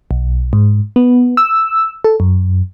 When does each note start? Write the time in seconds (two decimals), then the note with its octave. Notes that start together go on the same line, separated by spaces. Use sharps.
0.11 B1
0.53 G#2
0.96 B3
1.37 E6
2.04 A4
2.20 F#2